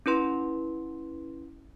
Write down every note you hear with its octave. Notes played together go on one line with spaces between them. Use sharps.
C#4 E4 B4 C6